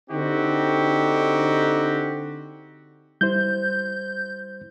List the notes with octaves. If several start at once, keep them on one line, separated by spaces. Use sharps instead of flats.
D3 C4 D#4 F#4 G4
G3 E4 C5 G6